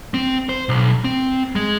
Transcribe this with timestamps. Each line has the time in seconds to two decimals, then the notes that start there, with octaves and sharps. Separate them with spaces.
0.14 C4
0.49 C5
0.69 B1
1.04 C4
1.55 G#3